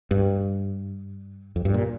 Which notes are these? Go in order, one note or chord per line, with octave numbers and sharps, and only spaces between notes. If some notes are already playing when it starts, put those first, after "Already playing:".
G2
F2
G2
A#2